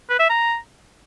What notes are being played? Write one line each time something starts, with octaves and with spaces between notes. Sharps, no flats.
B4
E5
A#5